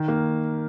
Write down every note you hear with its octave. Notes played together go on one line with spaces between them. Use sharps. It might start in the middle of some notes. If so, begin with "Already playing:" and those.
Already playing: D#3
A#3